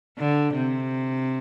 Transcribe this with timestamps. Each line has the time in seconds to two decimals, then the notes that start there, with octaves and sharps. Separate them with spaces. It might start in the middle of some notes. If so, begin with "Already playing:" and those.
0.18 D3
0.55 C3